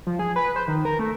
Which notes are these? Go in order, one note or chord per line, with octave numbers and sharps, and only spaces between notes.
F3
G#4
B4
C5
D#3
A#4
A3